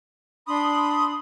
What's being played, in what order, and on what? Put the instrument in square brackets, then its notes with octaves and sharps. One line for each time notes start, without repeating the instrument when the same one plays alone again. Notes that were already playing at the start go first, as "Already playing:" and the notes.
[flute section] D4 B5 C6 [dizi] D#6